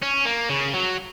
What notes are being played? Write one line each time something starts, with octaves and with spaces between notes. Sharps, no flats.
C#4
A#3
C#3
F#3